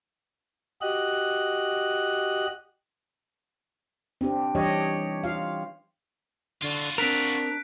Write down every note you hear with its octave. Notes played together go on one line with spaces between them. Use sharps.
F#4 G4 D#5 F#6
C4 D4 G4
E3 G3 D4 G4 C#5 D#5
F4 F5
D3 F4 F#4
C4 D4 A#4 F#6 B6 D7